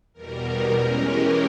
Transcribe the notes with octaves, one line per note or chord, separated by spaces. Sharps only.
E2 B2 G3 A#4
E3 G#3 C#4
G4